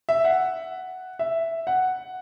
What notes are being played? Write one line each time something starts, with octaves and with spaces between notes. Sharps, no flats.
E5
F#5
E5
F#5